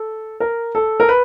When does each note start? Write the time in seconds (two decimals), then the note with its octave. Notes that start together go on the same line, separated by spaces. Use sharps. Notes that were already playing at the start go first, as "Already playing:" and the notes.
Already playing: A4
0.40 A#4
0.75 A4
1.00 A#4
1.09 B4